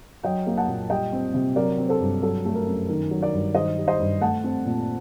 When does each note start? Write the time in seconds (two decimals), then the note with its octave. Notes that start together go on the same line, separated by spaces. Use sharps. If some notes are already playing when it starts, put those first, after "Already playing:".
0.23 F#3 D#5 G5
0.47 A#3
0.57 F#5 A5
0.68 A#2
0.90 G3 D#5 G5
1.13 C4
1.34 C3
1.56 F#3 A#4 D5
1.78 C4
1.89 A4 C5
2.01 G2
2.22 F#3 A4
2.45 A3
2.55 A#4
2.67 F#2
2.88 D#3 A#4
3.11 F#3
3.21 A#4 D5
3.33 G2
3.55 D#3 C5 D#5
3.77 G3
3.88 C5 D#5
4.00 G2
4.21 A3 F#5 A5
4.44 C4
4.66 A#2